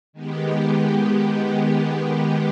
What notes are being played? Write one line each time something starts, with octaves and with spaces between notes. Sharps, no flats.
D#3 G#3 B3 G4